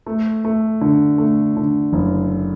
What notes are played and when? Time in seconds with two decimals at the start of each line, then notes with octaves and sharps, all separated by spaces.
0.06 A3
0.45 A3
0.81 D3
1.18 A3
1.57 D3
1.93 F#1